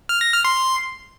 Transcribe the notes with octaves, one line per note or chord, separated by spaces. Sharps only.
F6
A#6
F6
C6